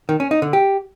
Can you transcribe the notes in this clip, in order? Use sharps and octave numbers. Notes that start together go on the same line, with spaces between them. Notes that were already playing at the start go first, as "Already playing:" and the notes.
D#3
C#4
D#4
D3
G4